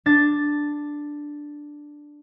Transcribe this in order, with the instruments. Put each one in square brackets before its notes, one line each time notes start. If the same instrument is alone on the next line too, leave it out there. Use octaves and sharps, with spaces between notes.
[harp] D4 A6